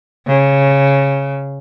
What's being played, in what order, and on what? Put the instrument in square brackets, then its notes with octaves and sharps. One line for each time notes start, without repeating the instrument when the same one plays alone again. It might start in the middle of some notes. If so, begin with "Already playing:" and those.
[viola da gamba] C#3